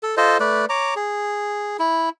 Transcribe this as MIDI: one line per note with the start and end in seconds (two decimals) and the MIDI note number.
0.03 0.15 69
0.17 0.38 65
0.17 0.38 69
0.17 0.38 72
0.17 0.38 75
0.40 0.65 57
0.40 0.65 71
0.40 0.65 74
0.69 0.94 73
0.69 0.94 82
0.69 0.94 86
0.96 1.77 68
1.79 2.09 64